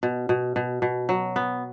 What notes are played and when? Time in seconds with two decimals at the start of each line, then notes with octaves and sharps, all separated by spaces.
0.03 B2
0.29 B2
0.56 B2
0.82 B2
1.09 F#3
1.36 B3